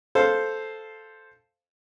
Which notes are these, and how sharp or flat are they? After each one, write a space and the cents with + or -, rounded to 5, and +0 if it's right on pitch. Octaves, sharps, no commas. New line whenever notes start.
A4 -5 C5 +0 F5 +0